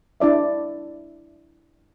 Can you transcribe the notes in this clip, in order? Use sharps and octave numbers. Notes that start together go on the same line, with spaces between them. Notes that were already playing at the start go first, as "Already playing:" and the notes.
D4 E4 D5 E5